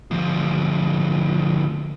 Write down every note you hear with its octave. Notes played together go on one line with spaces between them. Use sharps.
D2 F3